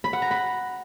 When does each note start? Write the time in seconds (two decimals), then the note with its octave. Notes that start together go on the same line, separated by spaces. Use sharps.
0.04 B5
0.13 F#5
0.22 A#5
0.31 B5